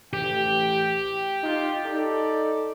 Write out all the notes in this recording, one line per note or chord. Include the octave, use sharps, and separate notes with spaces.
A1 G4 G5
D#4 F4
D#4 A4 D5